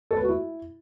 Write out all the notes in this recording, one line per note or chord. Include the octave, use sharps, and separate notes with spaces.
A4
B4
F#4
E4